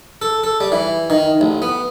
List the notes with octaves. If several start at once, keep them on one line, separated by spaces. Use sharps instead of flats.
A4
A4
G3
E3
D#3
A1
B3